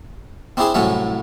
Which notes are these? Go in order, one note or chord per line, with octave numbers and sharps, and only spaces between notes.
C4 D4 E4 G4 G#4 C5
C2 A2 F#3 C#4 E5